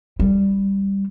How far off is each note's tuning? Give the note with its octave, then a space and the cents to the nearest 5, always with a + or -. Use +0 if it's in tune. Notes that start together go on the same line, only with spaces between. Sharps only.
G3 +5